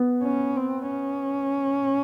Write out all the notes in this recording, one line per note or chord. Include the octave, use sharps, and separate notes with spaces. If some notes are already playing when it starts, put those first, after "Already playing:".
Already playing: B3
C#4
C4
C#4